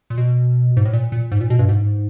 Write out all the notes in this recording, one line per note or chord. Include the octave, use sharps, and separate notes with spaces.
A#2
B2
G#2
A2
A#2
A#2
G#2
A#2
B2
G2
G#2